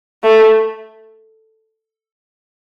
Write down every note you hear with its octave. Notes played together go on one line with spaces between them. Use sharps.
A3